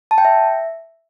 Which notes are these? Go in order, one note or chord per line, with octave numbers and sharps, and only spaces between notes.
A5
G5
E5